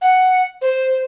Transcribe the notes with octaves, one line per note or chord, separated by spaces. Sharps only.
F#5
C5